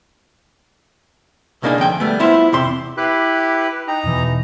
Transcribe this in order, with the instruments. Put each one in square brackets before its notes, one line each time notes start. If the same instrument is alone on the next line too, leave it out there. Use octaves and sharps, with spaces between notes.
[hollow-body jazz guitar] C2 C#3 A#3 D4 D#4 G#5
D2 F3 G5 G#5
G3 A3 B3
B3 E4 F4 C5
E2 C3 C6
[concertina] E4 G4 B4 [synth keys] D6 F#6 C7
[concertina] D#4 A#5 [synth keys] G5
[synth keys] E2 B2 E3